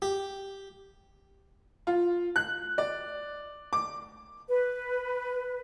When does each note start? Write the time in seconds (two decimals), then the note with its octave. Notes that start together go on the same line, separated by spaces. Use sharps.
0.02 G4
1.87 F4
2.36 F#6
2.78 D5
3.73 D6
4.49 B4